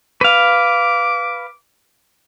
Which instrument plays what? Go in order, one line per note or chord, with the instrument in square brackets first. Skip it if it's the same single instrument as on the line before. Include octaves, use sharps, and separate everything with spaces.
[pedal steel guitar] B4 F5 [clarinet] D6